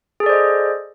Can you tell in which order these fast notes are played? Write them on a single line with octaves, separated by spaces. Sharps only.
G#4 A4 D5 C5 D#5